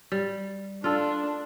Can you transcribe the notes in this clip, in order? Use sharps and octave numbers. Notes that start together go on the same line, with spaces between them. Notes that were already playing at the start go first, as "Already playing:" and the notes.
G3
D4 F4 A4